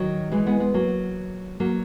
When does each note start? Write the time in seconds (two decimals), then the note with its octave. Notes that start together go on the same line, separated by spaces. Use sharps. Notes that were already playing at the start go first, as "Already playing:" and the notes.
Already playing: D#3 F#3
0.32 E3 G#3
0.46 G#3 B3
0.60 G#3 B3
0.74 F#3 A#3
1.60 F#3 A#3